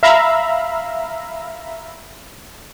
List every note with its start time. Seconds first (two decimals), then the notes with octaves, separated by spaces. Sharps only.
0.03 E5 F5 A#5 B5